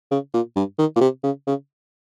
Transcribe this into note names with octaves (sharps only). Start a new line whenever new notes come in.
C#3
A#2
G2
D#3
A#2
C3
C#3
C#3